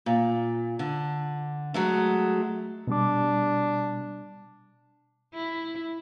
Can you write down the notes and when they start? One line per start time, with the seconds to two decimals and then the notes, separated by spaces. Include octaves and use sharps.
0.06 A#2
0.79 D3
1.74 F#3 G#3 A3
2.87 B2 G3 D4 D6
5.33 E4